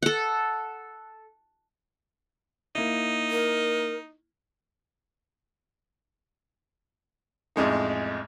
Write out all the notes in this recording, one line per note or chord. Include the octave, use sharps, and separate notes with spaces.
A4 F#5
A#3 D#4 E4
A#4
A1 F2 G#3 D#4